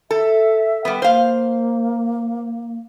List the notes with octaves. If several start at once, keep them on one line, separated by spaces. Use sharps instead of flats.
A4 E5
G3 B3
A#3 C5 F5